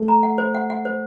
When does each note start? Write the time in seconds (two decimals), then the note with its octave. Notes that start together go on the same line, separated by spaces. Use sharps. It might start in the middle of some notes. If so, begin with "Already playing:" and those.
Already playing: A3
0.08 A#5
0.23 F#5
0.38 C5
0.55 F#5
0.70 F#5
0.85 C5